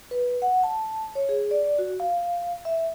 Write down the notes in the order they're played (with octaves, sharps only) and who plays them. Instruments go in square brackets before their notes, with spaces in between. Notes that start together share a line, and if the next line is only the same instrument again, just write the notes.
[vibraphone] B4
F#5
A5
C#5
G#4
D5
F#4
F5
E5